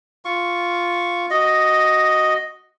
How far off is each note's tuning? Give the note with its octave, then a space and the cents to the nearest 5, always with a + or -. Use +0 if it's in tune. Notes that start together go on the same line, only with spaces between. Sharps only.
F4 +0 F5 +0 C#6 +0
F#4 +0 D#5 +0